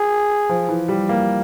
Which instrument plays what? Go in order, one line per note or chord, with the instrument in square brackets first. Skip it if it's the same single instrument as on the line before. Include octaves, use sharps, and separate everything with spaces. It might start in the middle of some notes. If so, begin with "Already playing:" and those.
Already playing: [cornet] G#4
[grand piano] F3
E3
G3
A#3